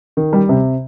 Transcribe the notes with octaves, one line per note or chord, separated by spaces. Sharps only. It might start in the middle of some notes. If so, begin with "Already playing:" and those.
D#3
G3
C3